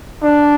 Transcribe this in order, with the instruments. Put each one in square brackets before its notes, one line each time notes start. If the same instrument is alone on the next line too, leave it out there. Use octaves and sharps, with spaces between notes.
[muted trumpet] D4